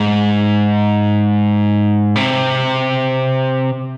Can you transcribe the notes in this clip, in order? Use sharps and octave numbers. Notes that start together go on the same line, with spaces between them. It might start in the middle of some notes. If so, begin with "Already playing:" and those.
Already playing: G#2
C3